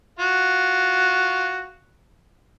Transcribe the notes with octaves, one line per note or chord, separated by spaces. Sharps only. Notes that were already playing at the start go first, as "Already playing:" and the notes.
F4 F#4